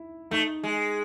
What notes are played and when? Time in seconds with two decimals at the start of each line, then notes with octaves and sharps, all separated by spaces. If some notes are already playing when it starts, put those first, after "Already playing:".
Already playing: E4
0.31 A3 D#4
0.64 G#3